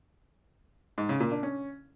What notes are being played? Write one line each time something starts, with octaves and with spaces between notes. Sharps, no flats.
G#2
C#3
A#2
D4
C#4